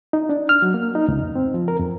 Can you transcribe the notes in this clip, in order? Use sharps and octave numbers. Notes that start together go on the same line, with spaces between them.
D#4
D4
F6
F#3
A#3
D#4
C#2
F2
C4
F3
A#4
F2